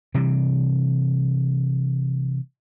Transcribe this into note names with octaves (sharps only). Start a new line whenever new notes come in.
C3 E3 G3